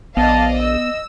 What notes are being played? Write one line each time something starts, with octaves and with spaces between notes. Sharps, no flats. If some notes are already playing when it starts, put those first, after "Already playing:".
A#1 B3 D5 D#5 F5 A5
D#5 E6